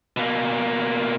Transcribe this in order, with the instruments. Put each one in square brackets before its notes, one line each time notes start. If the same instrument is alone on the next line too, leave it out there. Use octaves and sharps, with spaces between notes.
[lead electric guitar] B2 A#3